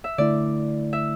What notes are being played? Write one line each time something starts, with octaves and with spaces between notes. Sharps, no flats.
E5
D3 A3 E4 D5
E5